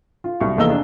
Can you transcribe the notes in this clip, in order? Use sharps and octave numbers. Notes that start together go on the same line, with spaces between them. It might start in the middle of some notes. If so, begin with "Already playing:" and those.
F4
C2 F#3 C#6
F1 E2 A#3 D#5 E6 G7
D4